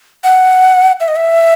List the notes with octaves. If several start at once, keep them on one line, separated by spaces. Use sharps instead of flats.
F#5
E5
D#5
E5